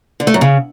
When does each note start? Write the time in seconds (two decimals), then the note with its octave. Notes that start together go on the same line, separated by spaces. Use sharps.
0.20 D3
0.27 A3
0.34 F#2
0.41 C#3